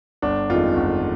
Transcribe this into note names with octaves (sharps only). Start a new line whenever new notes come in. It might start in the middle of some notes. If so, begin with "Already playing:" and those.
G1 D4
F2 D#3 G#3 F4
G1